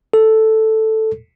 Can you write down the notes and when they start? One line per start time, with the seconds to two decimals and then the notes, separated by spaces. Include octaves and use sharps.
0.14 A4